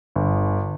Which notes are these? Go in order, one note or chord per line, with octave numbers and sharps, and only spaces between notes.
G1